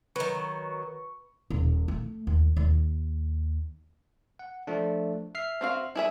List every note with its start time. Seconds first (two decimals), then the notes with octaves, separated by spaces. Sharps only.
0.16 D#3 F#3 B4 C#6
1.50 D#1
1.88 A3
2.27 D#2
2.57 D#2
4.39 F#5
4.67 F3 A3 D4
5.35 E5 F6 C7
5.61 C4 F#4 F5
5.96 E4 G#4 E5